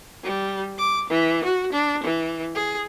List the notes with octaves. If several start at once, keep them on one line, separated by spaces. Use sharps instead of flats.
G3
D6
E3
F#4
D4
E3
G#4